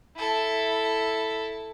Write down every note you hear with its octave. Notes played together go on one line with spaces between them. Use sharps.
E4 A4